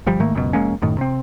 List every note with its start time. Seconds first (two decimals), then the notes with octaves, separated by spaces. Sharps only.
0.06 G1 F3 G3
0.20 G#2 D#3 A3 A#3
0.35 C#2 F#2 B2
0.53 F1 G#3 A#3 C#4
0.82 F#2 A2 D#3
0.98 C3 C4